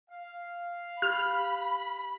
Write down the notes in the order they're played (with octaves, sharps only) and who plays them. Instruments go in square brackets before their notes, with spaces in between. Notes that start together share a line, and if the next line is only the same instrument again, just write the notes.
[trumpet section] F5
[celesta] G4 [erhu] B5 [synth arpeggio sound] F6